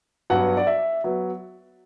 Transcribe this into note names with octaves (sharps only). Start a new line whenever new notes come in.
G2 F#3 B3 F#5
D5
E5
F#3 B3